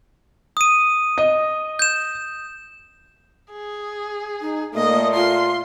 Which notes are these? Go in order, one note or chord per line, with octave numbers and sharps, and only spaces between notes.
D#6 D#7
D#5
G6 E7
G#4
D#4
A#2 A3 A#3 D#5
F4 C6